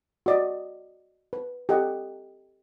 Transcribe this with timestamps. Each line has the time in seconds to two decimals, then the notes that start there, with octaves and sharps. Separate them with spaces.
0.26 F#4 D5 D#5
1.33 B4
1.69 G4 A4 D#5 F#5